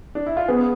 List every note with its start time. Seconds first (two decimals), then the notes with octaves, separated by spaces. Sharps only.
0.15 D4
0.26 E4
0.37 F4
0.48 B3 G#4